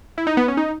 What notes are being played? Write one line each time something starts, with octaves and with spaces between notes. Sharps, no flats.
E4
D#4
B3
C#4
D#4